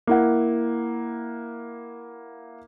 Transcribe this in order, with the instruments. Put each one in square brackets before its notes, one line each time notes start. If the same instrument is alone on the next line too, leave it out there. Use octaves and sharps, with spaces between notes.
[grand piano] A#3 E4 F#5